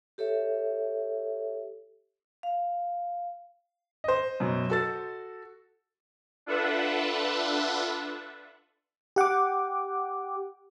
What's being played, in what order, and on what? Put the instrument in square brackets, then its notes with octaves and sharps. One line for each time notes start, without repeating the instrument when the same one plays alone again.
[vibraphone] G4 A4 C#5 E5
F5
[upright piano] C5 D#5
[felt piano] F#2 B2
F#4 A4 A6
[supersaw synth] D4 F4 A4 B4 E5 F#5
[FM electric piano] G4 F#5 G5 D6